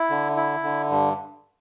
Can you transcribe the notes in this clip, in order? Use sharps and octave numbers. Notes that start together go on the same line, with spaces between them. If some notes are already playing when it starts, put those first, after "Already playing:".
Already playing: E4
D3
E4
D3
G2